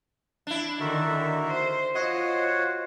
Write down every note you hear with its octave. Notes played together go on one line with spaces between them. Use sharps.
D4 E4
D3 D#3 F#4 A#4 E5
D3
C5
F4 F#4 C5 C#5 D#5 F#5